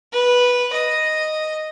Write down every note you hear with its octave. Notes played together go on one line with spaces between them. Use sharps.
B4
D#5